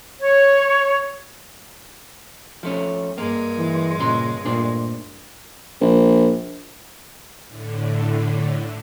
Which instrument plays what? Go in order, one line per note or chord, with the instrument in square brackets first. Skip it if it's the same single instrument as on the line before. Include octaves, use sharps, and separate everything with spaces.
[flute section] C#5
[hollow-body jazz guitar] F3 A3 C#4
[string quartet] G2 G#3 [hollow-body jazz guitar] A#3
[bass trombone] E3
[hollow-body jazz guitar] C#2 C#3 C6 [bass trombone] A#2
[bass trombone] A#2 [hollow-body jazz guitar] A3 D4 C5
[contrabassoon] A#1
[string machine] A2 D3